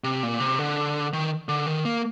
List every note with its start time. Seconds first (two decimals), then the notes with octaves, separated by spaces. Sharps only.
0.04 C3
0.23 A#2
0.40 C3
0.59 D3
1.13 D#3
1.49 D3
1.66 D#3
1.85 A#3